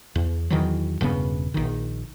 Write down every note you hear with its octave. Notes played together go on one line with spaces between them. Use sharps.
E2
E2 D#3 E3 F#3
E1 G2 C#3 B3
A#1 D#3